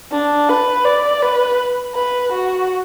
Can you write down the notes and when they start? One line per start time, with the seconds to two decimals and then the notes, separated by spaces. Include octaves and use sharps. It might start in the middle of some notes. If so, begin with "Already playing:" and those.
0.12 D4
0.49 B4
0.85 D5
1.22 B4
1.94 B4
2.32 F#4